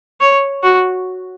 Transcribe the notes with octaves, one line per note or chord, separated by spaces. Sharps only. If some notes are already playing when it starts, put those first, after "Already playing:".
C#5
F#4